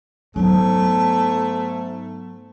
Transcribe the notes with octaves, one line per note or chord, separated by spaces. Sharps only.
G#2 F#3 A3 B3